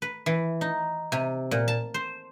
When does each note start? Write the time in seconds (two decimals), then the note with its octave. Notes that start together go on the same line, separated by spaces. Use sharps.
0.02 B4
0.26 E3
0.61 D#4
1.12 C3
1.51 A#2
1.68 A5
1.94 C5